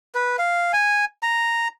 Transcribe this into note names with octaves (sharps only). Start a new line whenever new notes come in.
B4
F5
G#5
A#5